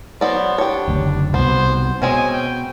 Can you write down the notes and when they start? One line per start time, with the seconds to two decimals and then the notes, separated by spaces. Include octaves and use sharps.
0.21 F#3 B3 C5 D5
0.58 D4 G4 C#5
0.88 F#1 D2
1.34 C2 B2 B3 C5
2.02 B2 G#3 C4 C#4 G#5
2.32 G5